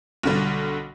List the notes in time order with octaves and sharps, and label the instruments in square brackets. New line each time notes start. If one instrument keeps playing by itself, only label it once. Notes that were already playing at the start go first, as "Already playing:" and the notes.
[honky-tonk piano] B1 D3 G3